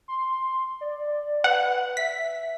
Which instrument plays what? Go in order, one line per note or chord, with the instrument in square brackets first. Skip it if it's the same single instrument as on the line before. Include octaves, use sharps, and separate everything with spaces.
[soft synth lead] C6
D5
[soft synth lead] B4 [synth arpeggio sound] F#5
[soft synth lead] E5 [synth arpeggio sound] B6